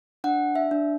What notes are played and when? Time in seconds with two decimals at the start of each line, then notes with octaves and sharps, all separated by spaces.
0.24 D4 F#5
0.55 E5
0.71 D4